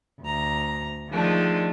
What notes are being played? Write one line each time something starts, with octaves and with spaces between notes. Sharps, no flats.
D2 A#5
D#3 F3 G#3 A3 D4